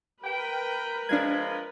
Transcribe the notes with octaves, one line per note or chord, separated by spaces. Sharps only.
A#4 B4 G5
F3 G#3 C4 D4 G#6